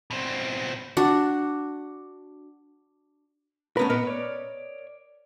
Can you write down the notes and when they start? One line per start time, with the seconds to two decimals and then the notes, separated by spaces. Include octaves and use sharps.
0.11 B2 C4
0.97 D4 F#4
3.77 A3 B3 C#4 A#4 B4
3.90 A#2 B3 A#4 B4 D#5
4.07 C#5 D5